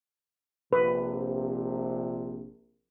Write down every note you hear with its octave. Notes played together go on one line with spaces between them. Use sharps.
A#1 C3 B4